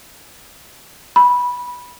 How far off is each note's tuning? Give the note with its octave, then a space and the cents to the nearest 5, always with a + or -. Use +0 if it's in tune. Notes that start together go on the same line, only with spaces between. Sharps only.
B5 -15